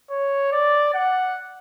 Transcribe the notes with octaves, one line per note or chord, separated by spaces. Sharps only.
C#5
D5
F#5